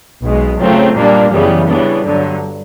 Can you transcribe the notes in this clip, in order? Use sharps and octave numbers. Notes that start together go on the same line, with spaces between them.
B1 B2 G#3
C#3 F#3 A3 C4 F4
A#2 G3 A#3 D4
F#2 C#3 E3 G3 B3
C#3 E3 G3 B3 D4
G2 D3 F#3